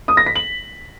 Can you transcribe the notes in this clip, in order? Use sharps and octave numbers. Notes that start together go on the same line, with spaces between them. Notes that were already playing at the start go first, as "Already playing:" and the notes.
D#6
A#6
B6
F#7